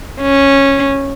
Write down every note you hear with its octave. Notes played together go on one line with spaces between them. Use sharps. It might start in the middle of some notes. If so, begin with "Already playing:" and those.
C#4